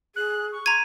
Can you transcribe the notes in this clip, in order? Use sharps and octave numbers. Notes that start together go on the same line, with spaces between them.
G#4 F#6
C#6
A#5 C6 G#6 D#7